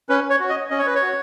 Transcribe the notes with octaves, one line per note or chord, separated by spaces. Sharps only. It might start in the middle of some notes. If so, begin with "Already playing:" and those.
C#4 B4
C#5
F#4
D#5
C#4 D#5
C#5
B4
C#5
F#4